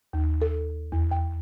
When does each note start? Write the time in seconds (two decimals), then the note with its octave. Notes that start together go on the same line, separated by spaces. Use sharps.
0.13 D#2
0.42 A4
0.92 E2
1.11 G5